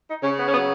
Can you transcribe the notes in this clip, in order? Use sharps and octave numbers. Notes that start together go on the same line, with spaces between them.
D#4
C#3 C#4
B3
C#4
F#3 B3